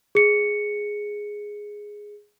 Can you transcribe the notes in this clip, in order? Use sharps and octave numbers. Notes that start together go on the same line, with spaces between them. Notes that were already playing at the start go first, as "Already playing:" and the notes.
G#4 C#7